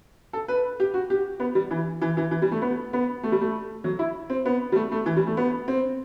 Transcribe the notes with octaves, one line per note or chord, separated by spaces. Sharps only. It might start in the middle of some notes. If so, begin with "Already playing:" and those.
A4
B4
G4
F#4
G4
B3
G3
E3
E3
E3
E3
G3
A3
B3
B3
A3
G3
A3
F#3
E4
C4
B3
G3
A3
A3
E3
G3
A3
B3
C4